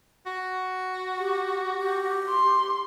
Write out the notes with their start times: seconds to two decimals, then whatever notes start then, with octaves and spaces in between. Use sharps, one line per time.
0.26 F#4
1.18 G4
1.79 G4
2.30 C6